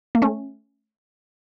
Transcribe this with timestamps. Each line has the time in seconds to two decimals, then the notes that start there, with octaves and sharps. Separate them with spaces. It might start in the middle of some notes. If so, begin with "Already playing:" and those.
0.15 A#3
0.22 A3 C#4